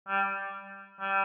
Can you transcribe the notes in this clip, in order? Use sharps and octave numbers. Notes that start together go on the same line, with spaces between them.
G3
G3